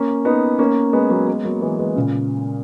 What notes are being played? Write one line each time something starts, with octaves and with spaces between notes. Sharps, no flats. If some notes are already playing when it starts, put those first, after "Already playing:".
Already playing: A#3 C#4
B3 D#4
A#3 C#4
G#3 B3
F#3 A#3
G#3 B3
F#3 A#3
E3 G#3
E3 G#3
A#2 C#3